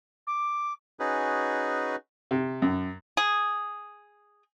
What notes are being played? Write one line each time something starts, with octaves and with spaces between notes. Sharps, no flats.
D6
C#4 D#4 F#4 G#4 B4
C3
F#2
G#4